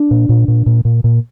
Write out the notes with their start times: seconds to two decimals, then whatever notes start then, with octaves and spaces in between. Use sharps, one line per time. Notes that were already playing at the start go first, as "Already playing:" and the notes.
Already playing: D4
0.11 A#2
0.29 A#2
0.48 A#2
0.66 A#2
0.85 A#2
1.04 A#2